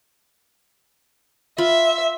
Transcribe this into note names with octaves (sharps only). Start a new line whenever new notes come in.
F4 E5 B5